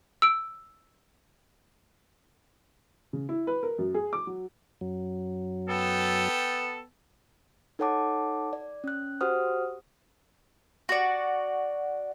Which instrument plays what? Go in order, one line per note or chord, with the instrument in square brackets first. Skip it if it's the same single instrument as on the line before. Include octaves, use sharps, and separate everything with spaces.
[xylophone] E6 D7
[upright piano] C#3
E4
B4
A#4
F#2
G#4
D6
F#3
[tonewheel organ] F#2 F#3
[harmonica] B3 G5 [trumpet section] A4
[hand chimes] D#4 A4 C#5 F#5 A5 D6
D5
C#4 F#6
F#4 G4 C5 F#5 D#6 F6
[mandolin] F#4 D5